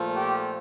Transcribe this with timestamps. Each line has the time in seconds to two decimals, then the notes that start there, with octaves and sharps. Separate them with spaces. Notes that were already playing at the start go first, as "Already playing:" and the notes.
Already playing: A#2 F3 A3
0.15 G4